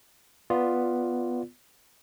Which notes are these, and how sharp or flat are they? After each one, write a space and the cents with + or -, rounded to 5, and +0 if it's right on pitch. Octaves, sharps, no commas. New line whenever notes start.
B3 +0 F4 +0 D5 +0